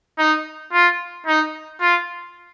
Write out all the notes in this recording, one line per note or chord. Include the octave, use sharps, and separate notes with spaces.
D#4
F4
D#4
F4